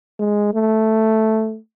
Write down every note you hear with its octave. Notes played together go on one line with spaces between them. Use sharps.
G#3
A3